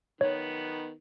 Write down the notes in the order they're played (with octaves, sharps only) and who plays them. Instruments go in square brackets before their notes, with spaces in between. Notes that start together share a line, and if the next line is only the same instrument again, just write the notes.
[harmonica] D#3 B3 [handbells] C#5